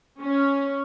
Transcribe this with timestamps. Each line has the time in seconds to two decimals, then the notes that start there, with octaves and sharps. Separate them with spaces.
0.21 C#4